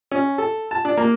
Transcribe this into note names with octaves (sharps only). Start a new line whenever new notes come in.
C#4
A4
A5
D4
A#3